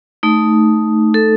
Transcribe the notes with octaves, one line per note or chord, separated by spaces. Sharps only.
A3 D#4
A4